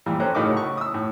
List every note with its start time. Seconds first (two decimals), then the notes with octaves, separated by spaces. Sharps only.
0.06 A#2 E3 F3 G3
0.20 C#4 G4 A4 C5 A#5 F#6
0.35 A2 C#3 F#3 D#4 A#4 D6
0.53 F#5 C#6
0.77 D#6 E6
0.94 A2